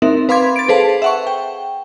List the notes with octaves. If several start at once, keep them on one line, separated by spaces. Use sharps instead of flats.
C4 D#4 A#4 E5
B4 F5 B5 C6 D6 G#6
A6 D7
G#4 A4 B4 C5 F5 A5
E5 F#5 C#6
G5